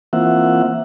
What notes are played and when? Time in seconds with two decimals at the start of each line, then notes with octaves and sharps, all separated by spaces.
0.13 E3 A#3 C4 F4 E5 F#5